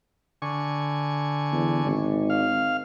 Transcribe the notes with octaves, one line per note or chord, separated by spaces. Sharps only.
D3 G#5 C#6
E2
G#1
F5